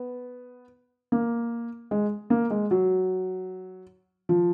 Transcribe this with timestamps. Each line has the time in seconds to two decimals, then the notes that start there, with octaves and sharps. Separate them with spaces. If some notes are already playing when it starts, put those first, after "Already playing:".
Already playing: B3
1.12 A#3
1.91 G#3
2.30 A#3
2.50 G#3
2.71 F#3
4.29 F3